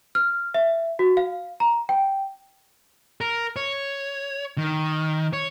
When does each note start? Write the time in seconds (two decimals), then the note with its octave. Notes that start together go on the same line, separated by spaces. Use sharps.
0.15 F6
0.54 E5
0.99 F#4
1.17 F5
1.60 A#5
1.89 G5
3.21 A#4
3.56 C#5
4.58 D#3
5.33 C#5